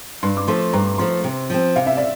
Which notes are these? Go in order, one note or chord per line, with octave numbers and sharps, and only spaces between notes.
G2 C6
D6
F3 A3 C6
G2 A#5
F3 A3 C6
C3
F3 C4
C3 F5
E5
D5